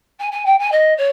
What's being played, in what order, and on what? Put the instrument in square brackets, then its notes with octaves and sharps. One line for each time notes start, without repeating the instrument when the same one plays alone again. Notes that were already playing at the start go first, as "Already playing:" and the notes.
[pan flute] G#5
G#5
G5
G#5
D#5
C#5